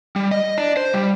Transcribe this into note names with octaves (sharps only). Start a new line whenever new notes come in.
G3
D#5
D4
C5
G3